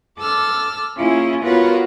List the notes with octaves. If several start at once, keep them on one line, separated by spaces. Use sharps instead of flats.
A4 D6 E6 F6
A#3 C#4 E4 F4 G#4
B3 F4 F#4 A#4 B4 C#5